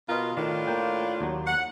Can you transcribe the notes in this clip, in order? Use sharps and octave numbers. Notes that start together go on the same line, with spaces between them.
B2 F4 A#4 B4 D#5
A2 D#3 D4 F4
A#3 G5
D#2 F#3
F#5